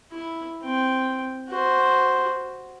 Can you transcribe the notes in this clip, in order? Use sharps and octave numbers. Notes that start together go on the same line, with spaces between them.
E4
C4 G5
F#4 C5